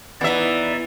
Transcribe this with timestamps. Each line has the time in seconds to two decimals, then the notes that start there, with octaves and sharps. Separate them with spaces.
0.21 E2 E3 B3 D#4 E4 D5 E5